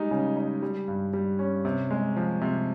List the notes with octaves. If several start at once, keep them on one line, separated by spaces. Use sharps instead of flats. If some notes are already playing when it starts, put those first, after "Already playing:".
Already playing: G3 G#3 D#4
C#3
D#4
G3
G2
G3
C#4
C3
G#3
F3
C3